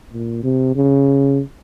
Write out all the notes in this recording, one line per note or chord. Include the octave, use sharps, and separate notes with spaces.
A#2
C3
C#3